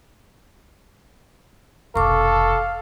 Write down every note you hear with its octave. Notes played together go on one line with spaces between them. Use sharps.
F1 B1 A4 F5 C#6 D6